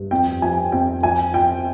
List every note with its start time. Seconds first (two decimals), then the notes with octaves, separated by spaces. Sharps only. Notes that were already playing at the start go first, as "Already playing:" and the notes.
Already playing: G2
0.11 F2 G5
0.42 F3 G#5
0.72 F2 G5
1.03 F3 G#5
1.34 F3 G5